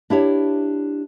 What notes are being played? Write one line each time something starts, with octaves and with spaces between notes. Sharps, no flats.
D4 E4 G4 C#5